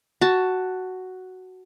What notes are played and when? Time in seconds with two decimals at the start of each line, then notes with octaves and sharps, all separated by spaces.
0.21 F#4 A5